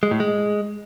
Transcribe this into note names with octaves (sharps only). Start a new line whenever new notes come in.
G#3
A2
G#3